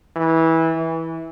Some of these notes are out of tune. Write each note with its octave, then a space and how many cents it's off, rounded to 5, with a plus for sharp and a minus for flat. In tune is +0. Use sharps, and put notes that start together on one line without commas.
E3 -20
E3 -10